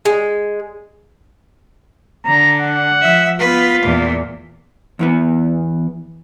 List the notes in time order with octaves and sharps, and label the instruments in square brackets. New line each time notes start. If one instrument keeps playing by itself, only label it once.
[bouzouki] G#3
[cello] D3 [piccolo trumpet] A#5
[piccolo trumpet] F#5
[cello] F3 E5
[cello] B3 B4 [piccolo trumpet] F4
[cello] E2 A#2
[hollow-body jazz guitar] E2 E3 B3